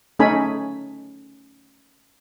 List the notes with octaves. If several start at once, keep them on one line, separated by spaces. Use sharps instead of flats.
A3 C#4 D#4 A4 G#5 B5